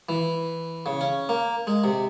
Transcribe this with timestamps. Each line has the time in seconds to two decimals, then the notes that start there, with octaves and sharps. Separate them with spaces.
0.09 E3
0.86 C#3
1.01 C#4
1.29 A#3
1.67 G#3
1.84 C3